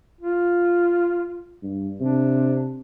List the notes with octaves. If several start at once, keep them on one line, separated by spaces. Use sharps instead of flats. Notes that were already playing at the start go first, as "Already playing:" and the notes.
F4
G2
C3 D4